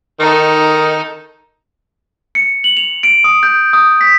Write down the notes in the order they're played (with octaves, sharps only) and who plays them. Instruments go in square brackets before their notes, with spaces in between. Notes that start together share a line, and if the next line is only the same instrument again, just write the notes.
[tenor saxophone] D#3 [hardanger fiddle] D#4 A4
[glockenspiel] C#7
F#7
F7
D7
D#6
G6
D#6
B6